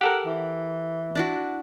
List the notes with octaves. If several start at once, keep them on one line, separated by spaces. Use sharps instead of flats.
G4 A4 A#4 F#5
E3
D4 E4 F#4